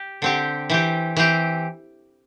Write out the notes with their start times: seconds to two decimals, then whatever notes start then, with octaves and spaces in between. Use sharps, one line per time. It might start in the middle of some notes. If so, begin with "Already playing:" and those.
Already playing: G4
0.22 D3 C4 G4
0.70 E3 C4 G4
1.16 E3 C4 G4